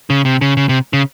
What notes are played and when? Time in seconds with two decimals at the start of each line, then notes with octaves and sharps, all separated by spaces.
0.10 C#3
0.25 C3
0.41 C#3
0.57 C#3
0.69 C3
0.93 C#3